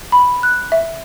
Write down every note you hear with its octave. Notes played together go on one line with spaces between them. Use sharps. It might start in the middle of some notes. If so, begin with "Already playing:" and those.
B5
F#6
E5